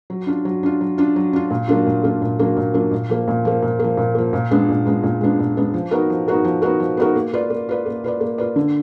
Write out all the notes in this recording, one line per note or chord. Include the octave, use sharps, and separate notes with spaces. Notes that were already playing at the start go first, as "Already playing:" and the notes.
F#3
D4 F4
F#3
D4 F4
F#3
D4 F4
F#3
D4 F4
A#2
F#3 A#3 D4 F4
A#2
F#3 A#3 D4 F4
A#2
F#3 A#3 D4 F4
A#2
F#3 A#3 D4 F4
A#2
F3 A#3
A#2
F3 A#3
A#2
F3 A#3
A#2
F3 A#3
A#2
G#3 B3 D4
A#2
G#3 B3 D4
A#2
G#3 B3 D4
A#2
G#3 B3 D4
F3
B3 D#4 F#4 A#4
F3
B3 D#4 F#4 A#4
F3
B3 D#4 F#4 A#4
F3
B3 D#4 F#4 A#4
A#3
F4 B4 D5
A#3
F4 B4 D5
A#3
F4 B4 D5
A#3
F4 B4 D5
D3